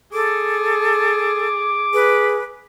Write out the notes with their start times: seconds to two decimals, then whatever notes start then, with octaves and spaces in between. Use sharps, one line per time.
0.13 G#4 A4 D6
1.94 G#4 B4